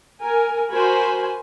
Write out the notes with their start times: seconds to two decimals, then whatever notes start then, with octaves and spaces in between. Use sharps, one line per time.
0.21 A#4 G#5
0.71 F#4 A#4 C5 G#5 B5